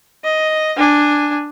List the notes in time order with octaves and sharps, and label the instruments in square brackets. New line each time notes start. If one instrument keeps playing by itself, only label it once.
[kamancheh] D#5
D4 G#5